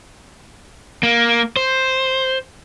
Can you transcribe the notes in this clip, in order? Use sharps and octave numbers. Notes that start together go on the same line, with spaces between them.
A#3
C5